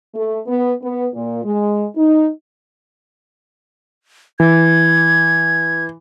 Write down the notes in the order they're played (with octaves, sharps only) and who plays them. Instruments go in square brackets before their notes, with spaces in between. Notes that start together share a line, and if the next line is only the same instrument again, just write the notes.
[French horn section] A3
B3
B3
A#2
G#3
D#4
[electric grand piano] E3 [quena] G#6